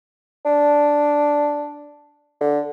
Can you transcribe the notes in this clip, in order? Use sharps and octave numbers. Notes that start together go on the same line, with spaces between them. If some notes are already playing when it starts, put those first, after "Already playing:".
D4
D3